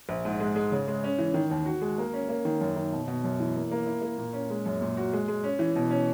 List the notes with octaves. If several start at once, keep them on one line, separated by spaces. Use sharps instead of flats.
A#1
G#2
G#3
G#3
C#3
G#3
C#4
E3
D#3
D#2
F#4
G#3
A#3
C#4
A#3
D#3
F#2
D#3
B2
B2
F#2
E3
A#3
A#3
E4
A#3
A#2
C#4
G#3
F#2
A#2
F#4
G#3
G#3
C#4
E3
B2
C#4